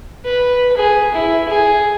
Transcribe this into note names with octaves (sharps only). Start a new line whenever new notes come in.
B4
G#4
E4
G#4